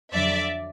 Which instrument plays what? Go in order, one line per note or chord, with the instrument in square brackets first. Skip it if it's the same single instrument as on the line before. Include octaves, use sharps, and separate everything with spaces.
[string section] F2 D3 F#3 D5 E5